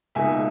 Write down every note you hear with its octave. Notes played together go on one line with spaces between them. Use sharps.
C#2 B2 A#3 D#4 E5 G#5